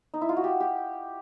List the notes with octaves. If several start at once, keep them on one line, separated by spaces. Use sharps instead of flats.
D#4
E4
F4
F#4
G4
G4